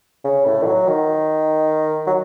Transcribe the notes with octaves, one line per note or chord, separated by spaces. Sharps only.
C#3
A2
E3
F#3
D#3
F#3